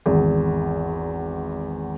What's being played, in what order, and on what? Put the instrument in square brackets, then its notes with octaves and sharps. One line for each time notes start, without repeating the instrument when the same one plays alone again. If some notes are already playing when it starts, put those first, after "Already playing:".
[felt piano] G#1 E2